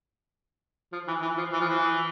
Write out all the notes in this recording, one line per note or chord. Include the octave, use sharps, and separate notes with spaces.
F3
E3
E3
F3
E3
F3
E3